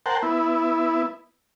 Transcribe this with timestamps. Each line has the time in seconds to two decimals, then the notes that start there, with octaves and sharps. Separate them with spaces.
0.06 A#4 C5 F#5 G5 A5
0.23 B3 E4